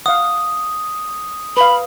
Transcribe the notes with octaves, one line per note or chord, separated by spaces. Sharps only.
F5 F#5 D#6
B4 F5 B5